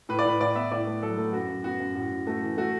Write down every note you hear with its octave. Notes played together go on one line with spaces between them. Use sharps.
A2 B4
D5
A2 B4
A2 D5
B3 E5
A2 D5
A3
F#3 A4
A3
F#2 F#4
F#2
B3 F#4
F#2
A2 F#4
A2
A3 F#4
E3
A3 F#4